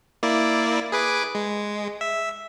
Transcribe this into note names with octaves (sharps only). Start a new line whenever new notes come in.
A#3 E4 D5
G#4 B4 D6
G#3
E5